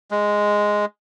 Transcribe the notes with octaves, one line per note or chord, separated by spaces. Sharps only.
G#3